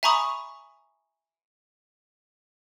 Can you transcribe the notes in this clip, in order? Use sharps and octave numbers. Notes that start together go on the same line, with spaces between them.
E5 G#5 A#5 B5 C#6 D#6